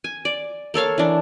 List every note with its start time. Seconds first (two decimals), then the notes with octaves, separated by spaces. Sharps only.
0.04 G#5
0.25 D5
0.74 A#3 A4 C#5 F5
0.98 E3 D4